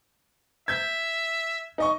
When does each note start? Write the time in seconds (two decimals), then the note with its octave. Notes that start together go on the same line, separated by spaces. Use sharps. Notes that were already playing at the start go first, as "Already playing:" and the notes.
0.68 E5 G6 G#6
1.78 D#4 D#5 C#6